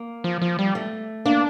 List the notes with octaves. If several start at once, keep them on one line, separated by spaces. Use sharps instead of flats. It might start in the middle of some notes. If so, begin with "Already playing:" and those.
Already playing: A#3
F3
F3
G3
A3
A#3 D4